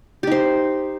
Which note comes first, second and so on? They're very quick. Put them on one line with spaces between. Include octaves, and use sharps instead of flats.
G4 D#4 C5